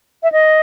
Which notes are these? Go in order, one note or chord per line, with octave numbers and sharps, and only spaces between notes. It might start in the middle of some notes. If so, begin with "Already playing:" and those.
E5
D#5